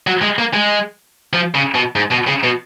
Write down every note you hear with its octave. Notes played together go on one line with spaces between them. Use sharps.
F#3
G#3
A#3
G#3
F3
C#3
B2
G#2
B2
C#3
B2